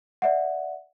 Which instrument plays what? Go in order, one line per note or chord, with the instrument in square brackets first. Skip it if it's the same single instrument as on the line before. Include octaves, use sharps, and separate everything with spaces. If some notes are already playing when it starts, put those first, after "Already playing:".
[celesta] D5 E5 F#5